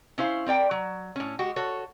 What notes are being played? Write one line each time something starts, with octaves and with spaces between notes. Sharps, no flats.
C#4 E4 C5 F5
C4 A#4 D5 G5
F#3
A2 C#4
G#3 F#4 G4
F#4 A4 C#5